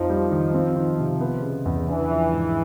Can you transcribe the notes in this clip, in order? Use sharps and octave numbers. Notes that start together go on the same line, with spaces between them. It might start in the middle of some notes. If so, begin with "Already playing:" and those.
Already playing: F2 F3 D#4
G3
D#3
C4
D#3
C3
B3
C#3
E2
E3 D4
F3
G#2